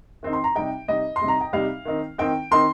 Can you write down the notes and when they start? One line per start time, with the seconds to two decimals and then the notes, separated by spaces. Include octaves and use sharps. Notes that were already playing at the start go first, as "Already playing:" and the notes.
0.23 D#3 C4 D#4
0.33 C6
0.44 A#5
0.55 C3 G3 D#4 G5
0.88 C3 G3 D#4 D#5
1.16 C6
1.21 C3 G3 D#4
1.28 A#5
1.41 G5
1.53 C3 G3 D#4 F5
1.85 D#3 C4 D#4
2.18 D#3 C4 D#4 G5
2.51 D#3 C4 D#4 C6